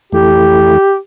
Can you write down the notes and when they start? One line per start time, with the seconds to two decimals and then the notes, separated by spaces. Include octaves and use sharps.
0.12 F2 E3 A3 E4 G4 A4